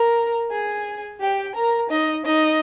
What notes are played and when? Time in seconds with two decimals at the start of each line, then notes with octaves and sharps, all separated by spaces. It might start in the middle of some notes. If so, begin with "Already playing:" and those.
Already playing: A#4 A#5
0.51 G#4 G#5
1.20 G4 G5
1.55 A#4 A#5
1.89 D#4 D#5
2.25 D#4 D#5